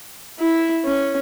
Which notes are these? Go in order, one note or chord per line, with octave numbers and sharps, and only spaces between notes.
E4
C#4